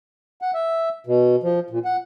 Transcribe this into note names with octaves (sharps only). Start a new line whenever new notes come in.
F#5
E5
B2
F3
A#2
F#5